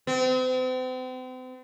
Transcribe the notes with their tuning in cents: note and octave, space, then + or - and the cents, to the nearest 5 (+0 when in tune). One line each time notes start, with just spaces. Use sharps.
C4 -40